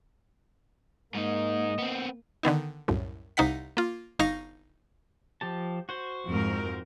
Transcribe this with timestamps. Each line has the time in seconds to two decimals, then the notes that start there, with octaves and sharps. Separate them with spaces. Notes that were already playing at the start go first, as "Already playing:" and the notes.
1.15 G#2 A#3 D#4 D#5
1.78 B3 C4
2.43 D3 D#3 B3 D#4
2.88 C2 F#2 A2
3.37 C2 C3 D#4 F5 F#5 B6
3.77 A#3 F4
4.19 G1 D#4 F5 C#6 A#6
5.41 F3 G4 A5
5.89 F#4 C5
6.27 F2 G#2 A#4